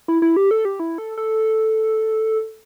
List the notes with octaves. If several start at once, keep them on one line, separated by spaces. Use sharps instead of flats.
E4
E4
G4
A4
G4
E4
A4
A4